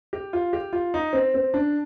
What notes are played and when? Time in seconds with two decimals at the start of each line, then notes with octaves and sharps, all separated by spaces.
0.13 G4
0.33 F4
0.53 G4
0.73 F4
0.94 D#4
1.13 C4
1.34 C4
1.54 D4